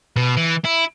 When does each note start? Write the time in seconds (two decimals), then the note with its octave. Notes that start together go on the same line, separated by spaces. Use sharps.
0.16 B2
0.37 E3
0.65 E4